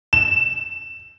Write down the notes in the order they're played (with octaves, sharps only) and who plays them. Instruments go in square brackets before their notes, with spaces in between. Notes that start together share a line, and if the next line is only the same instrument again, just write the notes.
[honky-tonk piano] E7